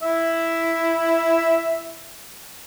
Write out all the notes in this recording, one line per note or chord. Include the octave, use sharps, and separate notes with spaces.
E4 E5